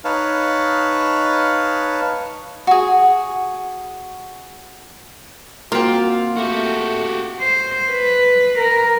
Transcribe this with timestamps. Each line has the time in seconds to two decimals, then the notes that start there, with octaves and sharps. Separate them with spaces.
0.05 D#4 B4 C#5 F5 A5
2.67 F#4 G#4
5.72 A#3 C4 F4 F#4
6.37 A3 F#4 G4
7.41 C5
7.91 B4
8.59 A#4